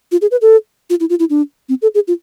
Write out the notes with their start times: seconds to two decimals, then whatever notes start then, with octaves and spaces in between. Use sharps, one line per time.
0.12 F4
0.22 G#4
0.31 B4
0.41 A4
0.90 F4
1.00 E4
1.10 F4
1.20 E4
1.30 D4
1.69 C4
1.82 A4
1.94 G#4
2.08 F4